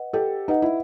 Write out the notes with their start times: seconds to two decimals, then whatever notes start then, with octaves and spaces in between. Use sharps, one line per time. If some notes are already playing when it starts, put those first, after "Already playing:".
Already playing: B4 D#5 F#5
0.13 G4 A4
0.48 D#4 B4 D#5 F#5
0.62 E4